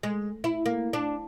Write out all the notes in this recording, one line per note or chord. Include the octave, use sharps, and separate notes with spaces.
G#3
E4
A#3
D4